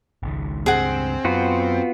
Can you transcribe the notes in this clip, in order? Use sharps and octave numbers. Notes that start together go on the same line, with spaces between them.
G#1 C#2 G#2
C#2 G2 C4 G#4 F#5
F#2 B3 F4 F#4